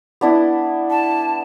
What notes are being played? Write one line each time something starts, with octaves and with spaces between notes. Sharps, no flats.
B3 D4 E4
A5